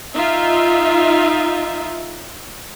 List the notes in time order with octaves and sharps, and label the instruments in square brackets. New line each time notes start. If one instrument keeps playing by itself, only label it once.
[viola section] D#4 F4 E5